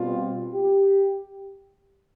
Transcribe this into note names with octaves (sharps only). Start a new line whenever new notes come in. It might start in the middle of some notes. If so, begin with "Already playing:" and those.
Already playing: B2 G3 C4 F4
G4